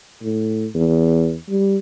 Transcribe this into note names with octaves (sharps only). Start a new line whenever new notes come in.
A2
E2
G3